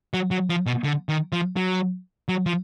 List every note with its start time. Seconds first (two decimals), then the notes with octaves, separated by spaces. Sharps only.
0.14 F#3
0.31 F#3
0.49 F3
0.66 B2
0.84 D3
1.09 D#3
1.32 F3
1.56 F#3
2.28 F#3
2.46 F3